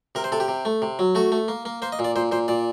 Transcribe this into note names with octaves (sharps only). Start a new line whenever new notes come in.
C3 A#4
C5
C3 A4
G4
C3
A3
C3
F#3
A3 F#4
A3
A#3
A#3
A#3 C5
D#5
A#2
D5
A#2 C5
A#2 C5
A#2 D5